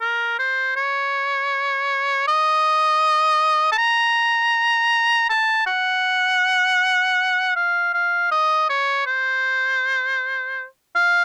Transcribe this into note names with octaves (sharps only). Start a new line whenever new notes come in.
A#4
C5
C#5
D#5
A5
A#5
A5
F#5
F5
F5
D#5
C#5
C5
F5